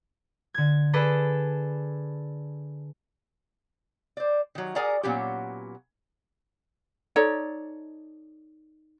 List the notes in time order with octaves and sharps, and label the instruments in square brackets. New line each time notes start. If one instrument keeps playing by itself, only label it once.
[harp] D3 G#6
D4 G#4 A4 B4 D5
[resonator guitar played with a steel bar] C5 D5
D#3 F#3
G#4 A#4 D5 F#5 G#5 A#5
A#2 F#3 B3 C#4 G4
[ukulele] D#4 A4 C#5 D5